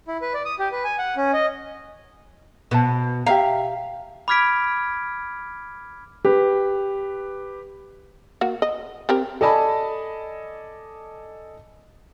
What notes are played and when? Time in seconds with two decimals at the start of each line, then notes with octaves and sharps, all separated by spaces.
0.08 E4
0.22 B4
0.34 D5
0.45 D#6
0.59 G4
0.72 B4
0.84 G#5
0.99 F#5
1.16 C#4
1.33 D#5
2.71 B2 B4 A5
3.26 G4 E5 F5 A#5
4.28 B5 D6 F6 G#6 B6 D7
6.25 G4 B4
8.41 A#3 F#4
8.62 D#5
9.09 C4 G4 A#4
9.41 A4 D5 D#5 G#5 A5 B5